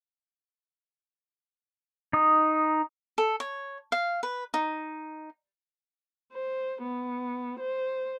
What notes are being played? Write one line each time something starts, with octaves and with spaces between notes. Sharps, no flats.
D#4 D#6
A4
C#5
F5
B4
D#4
C5
B3
C5